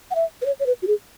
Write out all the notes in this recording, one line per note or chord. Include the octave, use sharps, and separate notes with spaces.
F#5
E5
B4
C#5
C#5
B4
F#4
G#4